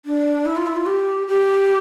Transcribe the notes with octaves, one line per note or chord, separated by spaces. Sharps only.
D4
E4
F4
E4
F4
G4
G4